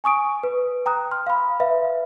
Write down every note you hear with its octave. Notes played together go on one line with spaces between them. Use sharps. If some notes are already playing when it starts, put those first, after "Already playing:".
G#5 C#6 D#6 D7
B4
G5 A#5 D#6 F#6
C6 F6
F5 B5
B4 E5 F5